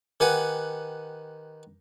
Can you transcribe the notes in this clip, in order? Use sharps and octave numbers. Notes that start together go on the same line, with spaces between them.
D#3 G4 B4 F#5 G#5